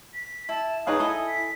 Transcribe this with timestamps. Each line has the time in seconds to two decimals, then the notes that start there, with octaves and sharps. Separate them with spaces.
0.14 B6
0.49 E4 A5
0.87 D#4 G#4 B4 C#5 F5 G#5 D#6
1.00 E4 A4 D#5 G#5
1.28 B6